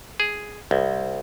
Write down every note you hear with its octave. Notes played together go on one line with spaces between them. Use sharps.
G#4
C2